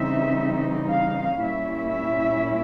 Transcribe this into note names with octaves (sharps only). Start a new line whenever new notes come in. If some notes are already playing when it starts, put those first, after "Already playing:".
Already playing: C#3 E3 G3 C4 D#4 E5
F5
A#2 G3 A#3 C#4 E4 E5
E5